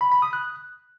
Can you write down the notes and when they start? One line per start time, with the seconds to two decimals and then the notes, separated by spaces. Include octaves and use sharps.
0.01 B5
0.12 B5
0.22 D#6
0.33 F#6